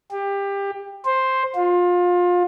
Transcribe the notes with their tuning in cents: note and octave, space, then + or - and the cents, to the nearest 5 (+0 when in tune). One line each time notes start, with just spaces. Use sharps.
G4 +20
C5 +5
F4 +25